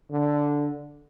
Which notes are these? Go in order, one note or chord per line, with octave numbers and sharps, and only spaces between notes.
D3